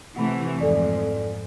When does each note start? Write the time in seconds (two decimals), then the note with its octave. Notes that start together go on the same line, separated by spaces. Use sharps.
0.16 C3 E3 A3 F#5 B5
0.59 F2 G#2 A4 D5 G#5